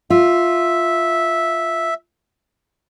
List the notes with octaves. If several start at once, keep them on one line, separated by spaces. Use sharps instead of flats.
F4 E5